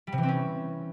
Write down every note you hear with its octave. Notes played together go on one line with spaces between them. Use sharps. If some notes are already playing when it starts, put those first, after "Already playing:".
G3
C3
E3
C4
C#4